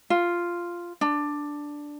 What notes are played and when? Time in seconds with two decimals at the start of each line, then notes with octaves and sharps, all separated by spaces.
0.10 F4
1.01 D4